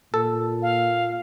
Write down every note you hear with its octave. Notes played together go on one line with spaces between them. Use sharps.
A#2 A4
F5